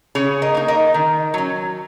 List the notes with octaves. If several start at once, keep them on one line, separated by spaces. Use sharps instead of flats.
C#3 G#4 C#5
A#4 D#5
A#3 D#4
A#4 D#5
D#3
F#3 C#4